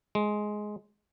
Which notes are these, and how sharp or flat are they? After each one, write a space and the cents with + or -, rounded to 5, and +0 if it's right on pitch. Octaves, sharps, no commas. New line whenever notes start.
G#3 +10